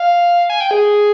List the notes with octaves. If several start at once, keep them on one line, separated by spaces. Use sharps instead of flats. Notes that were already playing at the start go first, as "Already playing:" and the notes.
Already playing: F5
G#5
G5
G#4